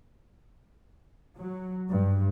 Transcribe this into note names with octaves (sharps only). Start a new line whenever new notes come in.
F#3
G2